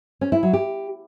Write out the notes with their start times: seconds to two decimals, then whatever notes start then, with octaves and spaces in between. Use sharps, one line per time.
0.21 C#4
0.32 E4
0.43 F#3
0.53 G4